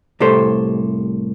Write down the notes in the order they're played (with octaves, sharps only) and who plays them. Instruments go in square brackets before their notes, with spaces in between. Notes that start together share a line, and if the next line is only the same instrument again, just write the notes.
[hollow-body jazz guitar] C2 A2 G4 A4 C5